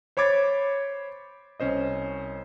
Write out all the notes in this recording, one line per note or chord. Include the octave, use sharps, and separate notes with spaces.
C5 C#5 B5 D6 G#6 A6
C2 C#4 C5 D#5